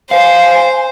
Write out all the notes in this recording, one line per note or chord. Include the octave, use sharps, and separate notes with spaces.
C5 F5 G#5